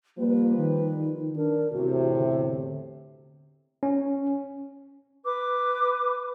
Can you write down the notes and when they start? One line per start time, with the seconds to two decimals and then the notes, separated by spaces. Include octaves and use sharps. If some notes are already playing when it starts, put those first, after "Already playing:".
0.18 F3 G3 A#3 B4
0.57 D#3
1.36 D4 A#4
1.73 E2 A2 C3 F#4
2.16 D3
3.83 C#4
5.24 B4 D6